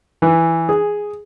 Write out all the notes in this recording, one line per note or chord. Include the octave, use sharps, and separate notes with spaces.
E3
G#4